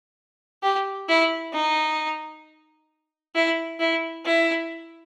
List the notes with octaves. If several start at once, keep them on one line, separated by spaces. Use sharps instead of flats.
G4
E4
D#4
E4
E4
E4